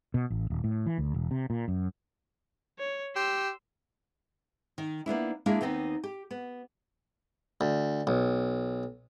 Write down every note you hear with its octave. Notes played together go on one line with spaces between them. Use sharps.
B2
A1
D#1
A2
E3
D2
E1
C3
A#2
F#2
C#5
G4 C6 E6
D#3
A#3 B3 D4 E4
G#3 A#3 D4 E4 G#4 F5
D#2 B3 C4 D#4
G4
B3
D2
B1